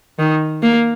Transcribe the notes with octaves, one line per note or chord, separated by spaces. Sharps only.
D#3
A#3